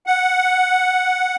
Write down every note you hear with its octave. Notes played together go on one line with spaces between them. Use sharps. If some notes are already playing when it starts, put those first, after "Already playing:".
F#5